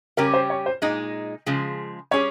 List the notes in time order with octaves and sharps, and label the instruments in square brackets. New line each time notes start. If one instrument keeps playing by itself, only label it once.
[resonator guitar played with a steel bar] C#3 G3 C#4 G4 [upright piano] A#4
[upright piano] C5
C#5
C5
[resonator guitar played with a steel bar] A#2 G#3 D#4 [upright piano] D#5
[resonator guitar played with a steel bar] C#3 F3 G#3
[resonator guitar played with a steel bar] G3 C#4 G#4 [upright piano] C#5